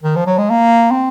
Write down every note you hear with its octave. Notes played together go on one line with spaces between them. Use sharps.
D#3
F3
F#3
G#3
A#3
C4